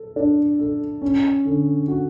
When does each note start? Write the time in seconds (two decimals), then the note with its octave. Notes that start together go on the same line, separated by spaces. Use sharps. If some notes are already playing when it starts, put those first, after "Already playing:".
Already playing: A4
0.16 D4
0.59 A4
1.02 C#4
1.45 D3
1.88 F#4